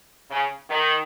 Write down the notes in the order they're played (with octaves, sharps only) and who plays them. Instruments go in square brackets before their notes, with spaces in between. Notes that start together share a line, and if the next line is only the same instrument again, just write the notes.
[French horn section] C#3
D#3